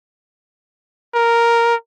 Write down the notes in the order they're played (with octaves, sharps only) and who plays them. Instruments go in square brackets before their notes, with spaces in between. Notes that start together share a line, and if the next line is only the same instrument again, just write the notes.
[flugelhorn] A#4